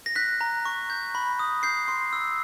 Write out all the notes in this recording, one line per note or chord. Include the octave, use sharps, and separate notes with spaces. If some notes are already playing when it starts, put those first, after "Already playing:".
A#6
F#6 B6
A#5
C#6
G6
B5
D#6
G6 C7
C6
E6